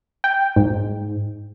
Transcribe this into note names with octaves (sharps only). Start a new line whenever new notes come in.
G5
G#2